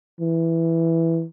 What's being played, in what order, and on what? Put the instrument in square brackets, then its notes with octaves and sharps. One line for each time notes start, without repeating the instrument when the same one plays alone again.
[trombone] E3